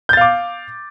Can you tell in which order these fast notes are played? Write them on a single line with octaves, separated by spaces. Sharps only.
G6 A6 F5 D6